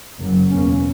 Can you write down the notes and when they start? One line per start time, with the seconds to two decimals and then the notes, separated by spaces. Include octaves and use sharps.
0.19 F#1 F#2 C#3 F#3
0.50 E2 B2 A#3 C#4